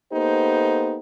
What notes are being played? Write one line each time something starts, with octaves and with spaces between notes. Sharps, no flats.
A#3 B3 D#4 G4 A4 C5